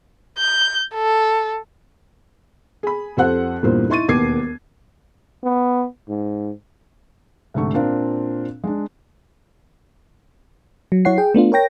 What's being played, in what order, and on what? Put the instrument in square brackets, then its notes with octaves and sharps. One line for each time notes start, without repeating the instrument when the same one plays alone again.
[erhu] G6
A4
[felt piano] G#4 B5
F2 G4 A4 C5 F#5 F#6
E2 G2 A#2 A#3 C5
D#4 E4 C6 C#6 A6 D#7
E1 D#2 B3 D6 G#6 C7
[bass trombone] B3
G#2
[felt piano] C2 G#2 D3 A3 C#6
A#2 C4 D4 A#4 F5
G#3 D4
[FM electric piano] F#3
F#3 E4 C#5 F#5 C7
G#4 G5
A3 B3 D4 F4
A#4 C#5 G5 A#6